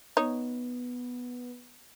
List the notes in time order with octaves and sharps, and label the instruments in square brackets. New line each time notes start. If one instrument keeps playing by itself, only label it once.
[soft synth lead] B3 [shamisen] D#4 C#5